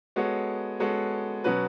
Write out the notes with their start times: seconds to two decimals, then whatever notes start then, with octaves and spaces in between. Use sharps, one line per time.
0.16 G#3 B3 F#4 A4 C#5
0.80 G#3 B3 F#4 A4 C#5
1.44 B2 F#3 C#4 F#4 B4